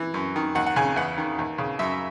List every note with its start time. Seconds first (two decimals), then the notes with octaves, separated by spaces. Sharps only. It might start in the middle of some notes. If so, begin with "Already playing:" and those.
Already playing: E3
0.14 F#2
0.36 D#3
0.55 D#2 F#5
0.66 F#5
0.76 C#3 G#5
0.96 E2 F#5
1.18 D#3
1.39 D#2
1.58 C#3
1.79 F#2 E5